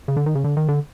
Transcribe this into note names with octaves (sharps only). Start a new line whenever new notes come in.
C#3
D3
D#3
C#3
D3
D#3
D3